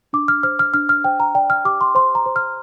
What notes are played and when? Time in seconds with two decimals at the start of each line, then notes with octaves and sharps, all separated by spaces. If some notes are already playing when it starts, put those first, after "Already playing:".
0.13 D4 D6
0.28 F6
0.43 C5 F6
0.59 F6
0.74 D4 F6
0.89 F6
1.04 C5 G5
1.20 A#5
1.35 D5 G5
1.50 F6
1.65 G4 D6
1.81 C6
1.95 C5 C6
2.15 A#5
2.26 C5
2.36 F6